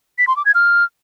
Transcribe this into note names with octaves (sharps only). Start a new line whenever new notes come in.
B6
C6
D6
G#6
F6